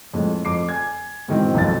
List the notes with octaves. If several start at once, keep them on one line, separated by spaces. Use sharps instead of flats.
F2 A2 G#3
F2 D6 C7
G#5 G#6
G#2 B2 D#3 E3 C4
B1 F2 A6